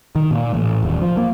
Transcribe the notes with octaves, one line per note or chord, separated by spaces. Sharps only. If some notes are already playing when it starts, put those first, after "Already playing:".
D#3
A#2
A1
D#1
F3
A#3